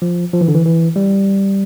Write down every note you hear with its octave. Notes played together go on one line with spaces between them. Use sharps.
F3
F3
E3
D3
E3
E3
G3